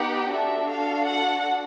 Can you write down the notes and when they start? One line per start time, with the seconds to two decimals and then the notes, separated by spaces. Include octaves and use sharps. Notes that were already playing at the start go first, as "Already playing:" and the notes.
Already playing: B3 D#4 G4 F#5
0.31 D4 F#4 A4 E5
0.68 F5
1.05 F#5